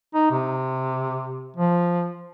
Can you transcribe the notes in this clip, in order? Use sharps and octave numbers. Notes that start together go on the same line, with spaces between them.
D#4
C3
F3